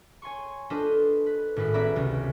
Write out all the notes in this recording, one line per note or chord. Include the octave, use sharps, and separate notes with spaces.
C#5 G#5 C6 C#6
D4 F4 A4 B4 C5 D#5
B4
G#1 A2 E4 B4 C7
B3 C#4 D5 E5 A#5 B5
C#2 C3